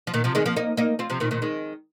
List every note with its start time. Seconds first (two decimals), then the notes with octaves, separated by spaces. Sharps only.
0.07 F3
0.14 A#2 D#3
0.24 C3 F3
0.35 D#3 G#3
0.46 F3 A#3
0.56 A#3 D#4
0.77 A#3 D#4
0.99 C4 F4
1.10 C3 F3
1.20 A#2 D#3
1.31 A#2 D#3
1.42 D#3 G#3